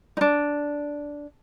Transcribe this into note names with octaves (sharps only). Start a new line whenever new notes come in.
D4 D#4